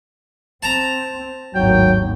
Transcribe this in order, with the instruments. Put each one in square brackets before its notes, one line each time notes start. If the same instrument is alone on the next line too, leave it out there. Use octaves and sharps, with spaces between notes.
[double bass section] C4 [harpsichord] A5 A#5
[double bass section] G#1 D#2 A2 [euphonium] F#3 [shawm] G5